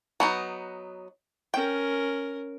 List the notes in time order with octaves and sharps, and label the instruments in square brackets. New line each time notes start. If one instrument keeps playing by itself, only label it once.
[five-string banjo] F#3 B3 D#4
[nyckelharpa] C#4 A#4 [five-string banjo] G5